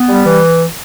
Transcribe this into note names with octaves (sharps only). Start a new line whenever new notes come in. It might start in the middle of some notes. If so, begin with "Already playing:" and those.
Already playing: B3
G3
E3